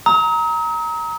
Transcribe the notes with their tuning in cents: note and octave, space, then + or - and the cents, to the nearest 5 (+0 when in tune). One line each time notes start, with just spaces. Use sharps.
A#5 +0 D#6 +45